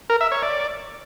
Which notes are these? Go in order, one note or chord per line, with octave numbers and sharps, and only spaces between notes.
A#4
E5
C#5
D5